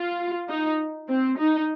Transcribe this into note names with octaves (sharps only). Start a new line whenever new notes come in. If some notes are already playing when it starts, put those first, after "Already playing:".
Already playing: F4
D#4
C4
D#4